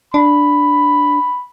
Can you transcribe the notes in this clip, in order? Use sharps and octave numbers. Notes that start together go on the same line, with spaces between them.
D4 B5